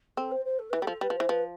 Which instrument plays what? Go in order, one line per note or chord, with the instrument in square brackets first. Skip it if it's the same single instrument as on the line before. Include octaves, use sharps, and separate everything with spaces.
[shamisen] C4 [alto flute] A4
[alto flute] C5
C5
A4
[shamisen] E3 [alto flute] B4
[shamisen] G3 [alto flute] A4
[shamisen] F3
[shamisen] G3 [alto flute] B4
[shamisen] F3
[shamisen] E3 [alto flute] C5
[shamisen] F3 [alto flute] B4